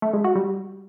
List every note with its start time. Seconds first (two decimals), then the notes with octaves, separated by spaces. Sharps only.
0.02 A3
0.13 G#3
0.24 F#4
0.35 G3